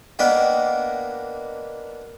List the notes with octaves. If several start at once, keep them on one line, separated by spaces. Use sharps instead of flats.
A#3 B3 D4 D#5 G5